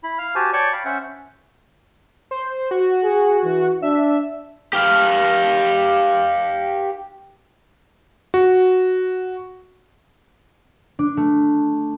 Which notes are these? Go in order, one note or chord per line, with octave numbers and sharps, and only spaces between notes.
E4 B5
F5 F6
F#4 G4 C5 G#5 A5
C#5 D5 G5 A5 C#6
F5 B5
C#4 C5 E5 F#5
C5
F#4
G#4
E3
D4 E5
G4 F5
F#4
D4
A3